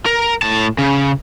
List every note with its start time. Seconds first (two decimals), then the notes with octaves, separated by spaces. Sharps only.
0.07 A#4
0.42 A2 A5
0.78 C#3